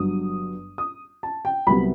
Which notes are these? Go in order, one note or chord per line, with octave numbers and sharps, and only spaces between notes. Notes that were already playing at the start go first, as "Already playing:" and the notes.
Already playing: G1 G2 F#3 D#6
D#6
A5
G5
C2 C3 F#3 B3 B5